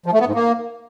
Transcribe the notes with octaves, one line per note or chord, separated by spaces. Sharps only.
F3
A3
B3
G#2
A#3